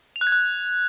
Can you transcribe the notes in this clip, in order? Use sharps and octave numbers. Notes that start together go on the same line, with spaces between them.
F7
F#6
G#6
F#6